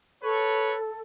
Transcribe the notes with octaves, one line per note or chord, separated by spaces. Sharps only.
A4 B4 C#5